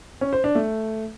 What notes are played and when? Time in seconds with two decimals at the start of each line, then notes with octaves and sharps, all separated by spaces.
0.21 C#4
0.33 C5
0.44 D4
0.55 A3